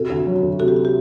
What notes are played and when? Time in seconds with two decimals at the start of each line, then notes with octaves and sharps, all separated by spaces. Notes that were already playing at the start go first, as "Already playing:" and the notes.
Already playing: C3 F#4 A4
0.10 D2
0.27 F#3
0.42 D2
0.59 C3 F#4 A4
0.68 G4
0.76 F#4
0.85 G4